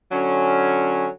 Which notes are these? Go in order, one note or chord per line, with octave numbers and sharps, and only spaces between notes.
D3 F#3 C#4